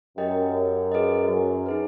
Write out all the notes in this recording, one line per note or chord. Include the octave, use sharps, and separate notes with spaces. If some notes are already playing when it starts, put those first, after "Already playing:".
F#2 G4 A#4 D#5 G5
G#4 B4 D#5
F#2
D#4 G#4 B4